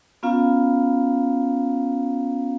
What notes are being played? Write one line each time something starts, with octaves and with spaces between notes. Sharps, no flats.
B3 C#4 F4 F5 A#5